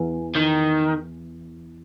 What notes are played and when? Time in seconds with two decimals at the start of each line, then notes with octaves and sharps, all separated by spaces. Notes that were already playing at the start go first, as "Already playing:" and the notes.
Already playing: E2
0.35 D#3